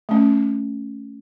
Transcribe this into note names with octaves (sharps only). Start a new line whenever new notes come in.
A3 C#4